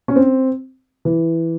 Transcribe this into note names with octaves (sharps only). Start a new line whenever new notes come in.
C#4
C4
E3